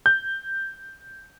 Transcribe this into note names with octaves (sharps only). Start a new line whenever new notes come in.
G6